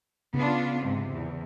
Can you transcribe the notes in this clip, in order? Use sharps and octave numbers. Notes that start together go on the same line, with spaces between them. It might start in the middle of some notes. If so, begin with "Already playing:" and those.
C#3 B3 D4 F4
G#2 C3
E2